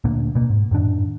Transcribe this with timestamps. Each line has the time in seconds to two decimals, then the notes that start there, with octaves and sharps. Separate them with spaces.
0.04 D2 A#2 A#3 D4
0.35 B2 A#3
0.50 G#2
0.71 F#2 A2 D#3 D4